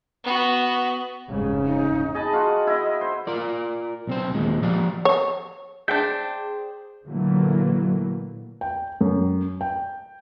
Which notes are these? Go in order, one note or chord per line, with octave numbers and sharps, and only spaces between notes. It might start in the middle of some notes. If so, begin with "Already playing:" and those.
B3 F#4
F1 G#2 C#3
D#4
G#4 D#5 A5 B5
F4 F#4 F#5
E4 D#5
C5
F4 A#4 D5
B1 C4 C5
D#2 A#2 G#3
F3 G4 D5 F5
C#5
D4 G#4 C5 E5 G5 G6
A#2 D3 E3 F#3 A3 A#3
G5
F#2
G5